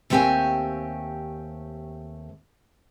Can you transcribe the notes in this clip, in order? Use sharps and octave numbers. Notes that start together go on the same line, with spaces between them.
D#2 A3 C4 G4 G5 G#5